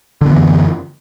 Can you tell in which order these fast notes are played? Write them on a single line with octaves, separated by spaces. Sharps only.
D3 B3 E3 F#2